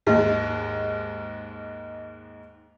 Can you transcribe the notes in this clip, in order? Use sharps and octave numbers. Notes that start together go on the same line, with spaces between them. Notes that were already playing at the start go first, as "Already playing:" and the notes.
D#2 G#2 G#3